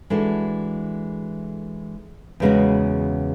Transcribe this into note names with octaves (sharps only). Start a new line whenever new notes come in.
E3 G#3 D4 F#4 A4
E2 C#3 G#3 B3 F#4